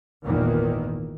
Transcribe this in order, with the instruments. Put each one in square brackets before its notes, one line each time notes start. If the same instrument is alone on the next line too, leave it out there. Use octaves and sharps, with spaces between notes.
[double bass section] G#1 E2 A#2 D#3 A#3